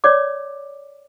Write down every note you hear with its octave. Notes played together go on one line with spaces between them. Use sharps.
C#5 D5 D6